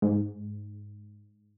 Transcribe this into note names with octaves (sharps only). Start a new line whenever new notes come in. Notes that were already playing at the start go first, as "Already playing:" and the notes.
G#2